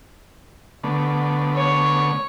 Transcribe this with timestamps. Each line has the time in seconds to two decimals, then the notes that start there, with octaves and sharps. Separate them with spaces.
0.84 D3 A3 B3
1.55 C#5